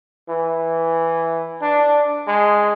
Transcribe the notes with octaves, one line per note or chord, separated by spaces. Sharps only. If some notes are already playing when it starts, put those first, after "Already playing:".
E3
D4
G#3